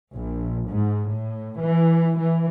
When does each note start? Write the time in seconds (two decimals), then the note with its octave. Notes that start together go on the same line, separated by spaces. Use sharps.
0.14 A#1
0.68 G#2
1.10 A2
1.60 E3
2.18 E3